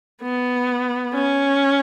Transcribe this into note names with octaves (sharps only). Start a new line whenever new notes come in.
B3
C#4